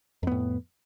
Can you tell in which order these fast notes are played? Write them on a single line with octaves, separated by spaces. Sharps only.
F2 B3 A2